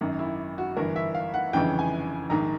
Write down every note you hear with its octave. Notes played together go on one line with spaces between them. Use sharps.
G#1 F#2 D#3
E4
F#4
G1 G2 E3 A#4
E5
F5
F#5
G1 F2 C#3 E3 G5
G#5
A#1 G#2 D#3 A#5